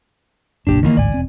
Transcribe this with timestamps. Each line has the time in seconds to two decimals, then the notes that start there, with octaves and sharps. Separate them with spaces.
0.67 F#1 B1 A#2 D4 G4
0.83 D#3 E3 A#3
0.97 A1 D2 G#2 D5 G#5
1.14 E1 C4